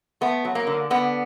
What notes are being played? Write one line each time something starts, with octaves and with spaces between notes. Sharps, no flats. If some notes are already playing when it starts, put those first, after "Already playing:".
A3 B3
F#3
A#3
D3
D3 B3